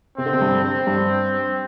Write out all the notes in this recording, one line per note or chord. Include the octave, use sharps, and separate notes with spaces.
C3 C4
D3
C3
G2
C4
G2